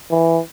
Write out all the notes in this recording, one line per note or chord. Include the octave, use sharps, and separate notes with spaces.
E3